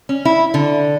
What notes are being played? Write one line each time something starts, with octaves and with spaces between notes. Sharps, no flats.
C#4
E4
D3